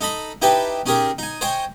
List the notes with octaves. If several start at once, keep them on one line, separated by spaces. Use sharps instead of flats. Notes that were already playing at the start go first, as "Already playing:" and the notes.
D#4 A4 D#5 B5
D#4 E4 G4 B4 G5 A5
C#4 D#4 G4 G#4 A#4
D#4 G#5
C5 C#5 D#5 G5 G#5